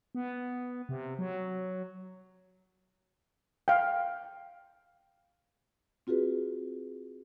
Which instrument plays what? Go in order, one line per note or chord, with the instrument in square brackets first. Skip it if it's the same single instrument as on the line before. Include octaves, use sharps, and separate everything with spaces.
[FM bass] B3
C3
F#3
[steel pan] F5 G5
[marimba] C4 F4 F#4 G#4 B4